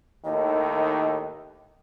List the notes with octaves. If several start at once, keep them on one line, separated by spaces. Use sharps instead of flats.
D#2 A2 D#3 D#5